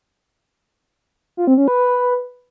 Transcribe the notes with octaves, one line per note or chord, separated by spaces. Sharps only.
F4
C4
C#4
B4